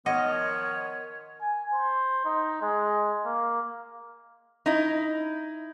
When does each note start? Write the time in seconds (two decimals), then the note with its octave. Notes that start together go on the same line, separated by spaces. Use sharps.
0.06 D#3 F3 B3 C#5 D#5 F#5
1.41 G#5
1.74 C5
2.25 D#4
2.62 G#3
3.25 A#3
4.66 D#4 E4